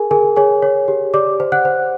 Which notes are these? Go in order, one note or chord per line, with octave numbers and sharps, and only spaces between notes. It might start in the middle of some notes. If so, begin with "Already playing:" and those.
Already playing: G#4 A#4 G#5
G#4 A#4 G#5
G#4 C#5 G#5
C#5
G4
G4 D5 D6
C5
F#5 F#6
C5